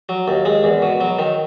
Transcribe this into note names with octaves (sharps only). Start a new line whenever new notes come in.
F#3
D#2
G#3
E2
B2
F#3
D#3